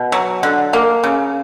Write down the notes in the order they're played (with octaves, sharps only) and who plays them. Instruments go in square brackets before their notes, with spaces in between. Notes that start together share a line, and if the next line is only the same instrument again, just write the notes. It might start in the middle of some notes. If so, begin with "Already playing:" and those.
Already playing: [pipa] B2
F#3
D3
A#3
C#3